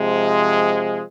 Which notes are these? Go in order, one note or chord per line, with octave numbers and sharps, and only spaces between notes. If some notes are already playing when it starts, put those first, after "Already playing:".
Already playing: C3 F3 G#3